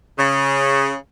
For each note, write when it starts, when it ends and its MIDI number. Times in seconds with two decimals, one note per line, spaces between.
0.18 0.94 49